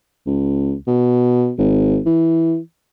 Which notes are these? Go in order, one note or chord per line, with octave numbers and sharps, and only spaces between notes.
C#2
B2
G#1
E3